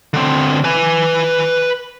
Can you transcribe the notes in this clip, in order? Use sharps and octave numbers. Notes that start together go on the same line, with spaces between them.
D3 C4
B4 G#5